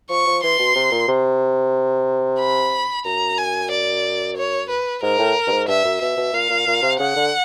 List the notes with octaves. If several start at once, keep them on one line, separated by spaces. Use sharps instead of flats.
F3 C#6
F3
E3 C6
B2
C3
A#2
C3
B5
F#2 A#5
G#5
D5
C#5
B4
G#2 A#4
A2
G2
G#2
G2 E5
F#2
B2 E5
B2
A#2 F5
A#2
A#2
C3
C#3 F#5
D3